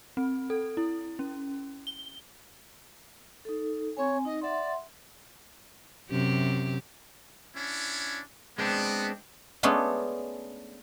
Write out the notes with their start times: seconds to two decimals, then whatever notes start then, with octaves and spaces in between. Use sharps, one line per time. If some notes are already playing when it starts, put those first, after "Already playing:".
0.17 C4
0.50 A4
0.77 E4
1.19 C#4
1.87 G7
3.45 D#4 A4
3.97 C4 C#5 G#5
4.25 D#4 D#5
4.42 D5 E5 F#5 C6
6.11 F#2 C3 G4
7.56 C#4 D4 E4
8.58 G#3 B3 C4 D4
9.63 G#3 A3 B3 C#4 D4 A4